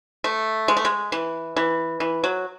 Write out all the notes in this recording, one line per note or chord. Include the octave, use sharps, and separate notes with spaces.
A3
G#3
A3
G#3
E3
E3
E3
F#3